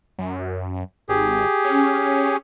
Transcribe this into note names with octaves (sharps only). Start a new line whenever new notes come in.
F#2
G#1 G4 G#4
C#4